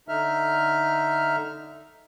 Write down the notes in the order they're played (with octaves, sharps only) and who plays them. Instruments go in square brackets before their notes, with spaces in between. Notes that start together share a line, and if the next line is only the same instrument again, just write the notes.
[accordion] D3 D#4 E5 F6